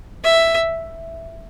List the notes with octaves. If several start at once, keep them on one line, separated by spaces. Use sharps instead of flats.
E5